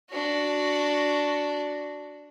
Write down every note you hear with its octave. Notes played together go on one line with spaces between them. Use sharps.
D4 F#4